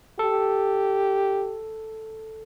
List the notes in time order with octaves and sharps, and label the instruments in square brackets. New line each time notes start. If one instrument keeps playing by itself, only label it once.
[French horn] G4 [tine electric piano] A4